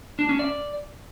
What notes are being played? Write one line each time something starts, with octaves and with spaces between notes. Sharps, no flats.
D4
C#4
D5